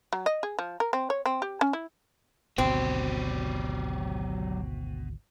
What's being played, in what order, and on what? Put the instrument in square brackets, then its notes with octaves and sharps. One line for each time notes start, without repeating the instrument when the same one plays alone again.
[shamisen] F#3
D#5
G#4
F3
A#4
C4
C#5
C4
G4
C#4
E4
[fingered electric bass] G#1 D2 [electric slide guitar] B2 [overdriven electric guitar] F#3 G4 [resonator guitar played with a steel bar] C4